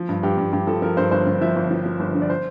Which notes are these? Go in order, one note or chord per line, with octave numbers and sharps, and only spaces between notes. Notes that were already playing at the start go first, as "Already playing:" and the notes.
Already playing: F3
G2
G2 G4
G2
G2 G4
F3 A4
F3 A#4
G2 C5
G1 C5
G2
F3 E5
G1
F3
F3
G1
D3
D5
C5